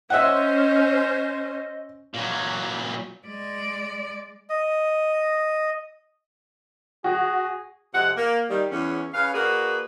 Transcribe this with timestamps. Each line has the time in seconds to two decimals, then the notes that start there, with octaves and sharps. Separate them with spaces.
0.10 C#4 C5 D#5 E5 F#5
2.14 A#2 F#3
3.26 G#3 D5
4.49 D#5
7.04 F#4 G#4
7.94 F2 C3 G#3 F#5
8.17 A#3
8.49 D#3 G3
8.71 E2 C#4
9.14 C#3 B4 F5
9.34 A#3 D4 F#4 G#4 B4